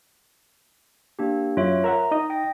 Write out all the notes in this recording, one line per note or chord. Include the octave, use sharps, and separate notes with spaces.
A#3 D4 G4
F#2 F4 C#5 E5
A#4 E5 F#5 A#5
D#4 D#5 D#6
G5 A#6